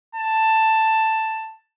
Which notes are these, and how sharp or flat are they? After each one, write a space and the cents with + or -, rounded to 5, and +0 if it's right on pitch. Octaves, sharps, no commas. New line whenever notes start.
A5 +10